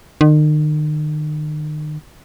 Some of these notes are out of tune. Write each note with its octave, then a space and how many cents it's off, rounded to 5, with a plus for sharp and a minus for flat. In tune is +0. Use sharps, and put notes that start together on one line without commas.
D#3 -40